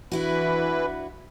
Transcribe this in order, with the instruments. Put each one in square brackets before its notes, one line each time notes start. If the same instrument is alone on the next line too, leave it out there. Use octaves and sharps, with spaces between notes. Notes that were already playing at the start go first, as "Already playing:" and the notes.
[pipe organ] E3 B4 [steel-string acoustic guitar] D4 E4 F#4